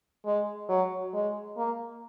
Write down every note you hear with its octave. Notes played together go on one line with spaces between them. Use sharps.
G#3
F#3
G#3
A#3